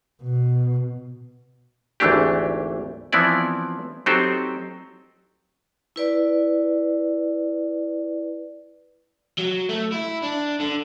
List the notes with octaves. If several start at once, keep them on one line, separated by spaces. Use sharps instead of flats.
B2
G#1 D2 E3 A3 D4 G4
E3 F3 B3 C4 E4 D5
F#3 C4 D#4 G4 A4 C5
E4 B4 D5
F#3
A3
E4
D4
D3